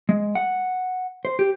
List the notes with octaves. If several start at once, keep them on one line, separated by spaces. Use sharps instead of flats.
G#3
F#5
C5
G4